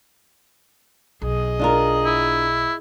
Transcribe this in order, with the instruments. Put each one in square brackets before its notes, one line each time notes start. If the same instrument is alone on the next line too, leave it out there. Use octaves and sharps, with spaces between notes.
[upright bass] B1 [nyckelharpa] G#4 D#5
[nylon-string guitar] D4 F4 A#4
[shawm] E4